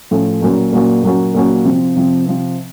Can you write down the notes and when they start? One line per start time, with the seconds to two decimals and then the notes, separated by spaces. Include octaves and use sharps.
0.11 A2 F3 A3 C#4 A4
0.41 A#2 F#3 A#3 C#4 F#4
0.72 A#2 F#3 A#3 C#4 F#4
1.03 A#2 F#3 A#3 C#4 F#4
1.34 A#2 F#3 A#3 C#4 F#4
1.65 C3 F3 C4
1.96 C3 F3 C4
2.26 C3 F3 C4